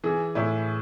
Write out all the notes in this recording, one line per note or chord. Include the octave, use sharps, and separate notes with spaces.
E3 G#4
A2 E4